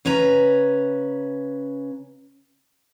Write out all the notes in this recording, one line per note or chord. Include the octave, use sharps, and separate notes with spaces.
C#3 C#4 B4 A#5